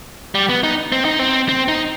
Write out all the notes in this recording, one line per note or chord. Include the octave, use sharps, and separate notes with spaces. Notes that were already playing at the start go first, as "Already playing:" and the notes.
G3
B3
D#4
C4
D#4
C4
C4
D#4